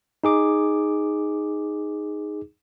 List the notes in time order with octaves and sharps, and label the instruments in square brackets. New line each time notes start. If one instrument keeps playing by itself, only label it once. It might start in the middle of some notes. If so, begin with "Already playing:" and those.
[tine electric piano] D#4 G#4 D6